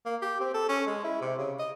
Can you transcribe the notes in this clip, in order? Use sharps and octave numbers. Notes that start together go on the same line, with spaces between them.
A#3
G4
C4
A4
C#4
G#3
E4
C3
C#3
D#5